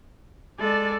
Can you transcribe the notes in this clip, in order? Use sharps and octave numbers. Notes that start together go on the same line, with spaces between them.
G#3 A4 D5